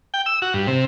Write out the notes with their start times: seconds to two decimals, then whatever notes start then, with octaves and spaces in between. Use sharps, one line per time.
0.14 G5
0.26 E6
0.42 F#4
0.54 G2
0.67 C3